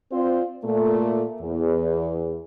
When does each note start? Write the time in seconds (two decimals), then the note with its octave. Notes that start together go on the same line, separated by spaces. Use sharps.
0.11 C4 F4 C5 D5
0.63 A#2 A3
1.41 E2